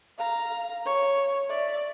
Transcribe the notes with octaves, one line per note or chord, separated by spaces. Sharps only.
F5 A#5
C#5
D5 E5